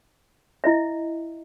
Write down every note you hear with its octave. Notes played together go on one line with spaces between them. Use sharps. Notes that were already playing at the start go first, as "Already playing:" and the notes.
E4 D#5 E5